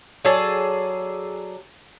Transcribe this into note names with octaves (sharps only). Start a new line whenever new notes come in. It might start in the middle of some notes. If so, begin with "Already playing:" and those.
F#3 G#4 A4 D5